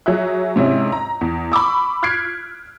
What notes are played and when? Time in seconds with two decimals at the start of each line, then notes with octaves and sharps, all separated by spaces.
0.06 F#3 G#4 E5 F#6
0.56 G#2 C3 C#4 E4
0.92 A#5
1.21 E2
1.52 B5 C#6 D6 E6
2.03 F6 F#6 G#6 B6 C7 D7